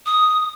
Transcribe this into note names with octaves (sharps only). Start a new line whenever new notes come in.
D#6